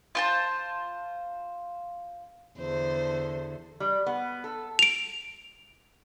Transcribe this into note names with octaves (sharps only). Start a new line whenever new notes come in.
F4 C5 A5
E2 D3 C5
G3
B3
A4
D7 F7